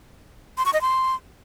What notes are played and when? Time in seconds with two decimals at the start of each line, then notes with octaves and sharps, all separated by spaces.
0.57 C6
0.65 C#6
0.73 D#5
0.81 C6